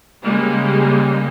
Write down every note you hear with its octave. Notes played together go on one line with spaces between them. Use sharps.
C#3 G3 G#3 A#3